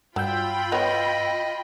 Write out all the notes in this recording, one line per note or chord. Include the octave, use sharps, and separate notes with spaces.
G2 F#3 F4 G5 B5 E6 G6
B3 C#5 D#5